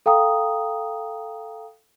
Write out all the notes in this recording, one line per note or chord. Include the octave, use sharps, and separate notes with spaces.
A4 F5 G5 A#5 D#6